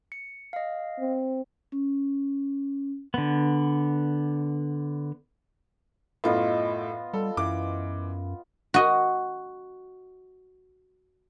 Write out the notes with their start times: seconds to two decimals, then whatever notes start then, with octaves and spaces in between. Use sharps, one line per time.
0.12 C#7
0.53 D#5 F5
1.00 C4
1.72 C#4
3.14 D3 B3
6.24 F#2 A2 B3 F4 D#5
7.14 G3 A4
7.37 F#2 E3 D6
8.74 F#4 D#5